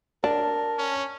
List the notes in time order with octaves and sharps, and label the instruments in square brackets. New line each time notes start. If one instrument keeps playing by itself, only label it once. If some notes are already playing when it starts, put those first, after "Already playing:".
[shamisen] D4 [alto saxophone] A#4 [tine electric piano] A5
[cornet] C#4